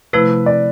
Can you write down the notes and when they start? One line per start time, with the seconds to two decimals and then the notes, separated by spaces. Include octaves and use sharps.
0.13 C3 F3 A3 E4 B4
0.46 D5